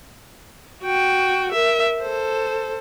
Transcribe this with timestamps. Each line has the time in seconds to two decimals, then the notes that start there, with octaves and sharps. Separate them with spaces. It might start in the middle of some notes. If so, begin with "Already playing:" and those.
0.84 F#4 G5
1.52 A#4 E5
2.01 A4 C5